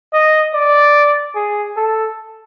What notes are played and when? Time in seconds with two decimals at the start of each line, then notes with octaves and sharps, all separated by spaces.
0.13 D#5
0.54 D5
1.35 G#4
1.77 A4